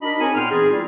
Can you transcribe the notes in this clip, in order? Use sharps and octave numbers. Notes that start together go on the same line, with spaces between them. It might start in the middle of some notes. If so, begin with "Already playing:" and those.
D4 D#4 F#4 A#4 D#5 B5
C4 D#4 G#4 A#4 C#5 G#5
A#2 B3 G5 C6 F6
E3 C4 D#4 F4 G#4
G3 E4 F4